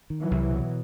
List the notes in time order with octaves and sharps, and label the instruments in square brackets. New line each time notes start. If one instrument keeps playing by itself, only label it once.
[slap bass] D#3
[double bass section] E3 F#3
[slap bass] C2
B2